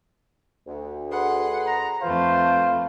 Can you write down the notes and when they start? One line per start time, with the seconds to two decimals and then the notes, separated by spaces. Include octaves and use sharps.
0.67 D2
1.11 G#4 B4 F#5 C6
1.66 A#5
2.02 F2 A3 F4 B4 C5 F5